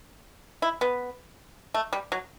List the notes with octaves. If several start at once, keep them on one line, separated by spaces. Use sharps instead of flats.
E4
B3
A3
G3
F#3